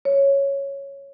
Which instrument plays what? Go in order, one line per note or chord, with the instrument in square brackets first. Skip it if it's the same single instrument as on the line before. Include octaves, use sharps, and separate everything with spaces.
[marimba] C#5